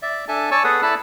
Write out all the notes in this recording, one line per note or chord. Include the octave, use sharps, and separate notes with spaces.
D5 E5
D4 A4 E5 G#5 A5
C#5 D5 G#5 A5 C#6 E6
B3 G#4 A4 B4 F#5 D#6
E4 A4 D5 A5 B5 E6